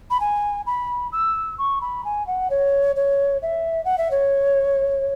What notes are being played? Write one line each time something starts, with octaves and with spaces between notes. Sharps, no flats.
B5
G#5
B5
E6
C#6
B5
G#5
F#5
C#5
C#5
E5
F#5
E5
C#5